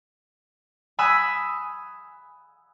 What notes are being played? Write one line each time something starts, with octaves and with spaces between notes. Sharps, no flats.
G#5 B5 D#6 E6 F#6